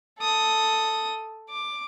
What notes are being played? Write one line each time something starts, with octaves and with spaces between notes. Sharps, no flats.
A4 D#6
D6